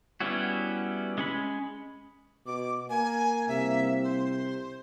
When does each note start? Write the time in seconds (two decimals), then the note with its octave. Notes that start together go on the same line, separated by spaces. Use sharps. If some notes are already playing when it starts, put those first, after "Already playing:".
0.20 G3 B3 C#4 E4 F#4
1.18 G#3 C#4 B5
2.46 B2 D6
2.89 A#3 G#5
3.48 C2 C3 E5
4.03 C5